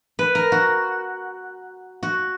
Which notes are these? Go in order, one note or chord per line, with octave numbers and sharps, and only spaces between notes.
B4
A#4
F#4
F#4